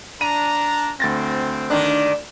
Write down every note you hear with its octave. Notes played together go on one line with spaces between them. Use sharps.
D4 A#5 D#7
D2 C4 A6 A#6
D#3 D4